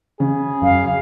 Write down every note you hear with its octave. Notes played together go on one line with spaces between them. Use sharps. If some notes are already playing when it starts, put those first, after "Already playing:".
C#3 G#4
F#2 F5